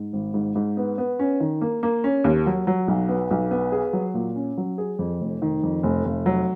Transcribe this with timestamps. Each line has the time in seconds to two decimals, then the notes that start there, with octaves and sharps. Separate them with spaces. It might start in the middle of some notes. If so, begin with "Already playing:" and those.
Already playing: G#2
0.13 G#1
0.34 G#2
0.55 G#2
0.77 B3
0.98 B3
1.19 C#4
1.40 D#3
1.61 A#3
1.83 A#3
2.04 C#4
2.24 D#2
2.46 F#3
2.67 F#3
2.88 B1
3.09 B3
3.31 B1
3.51 B3
3.72 G#4
3.93 F#3
4.14 A#2
4.36 C#4
4.58 F#3
4.78 G#4
4.99 F2
5.21 F1
5.42 D#3
5.63 F2
5.83 F1
6.05 F1
6.26 F#3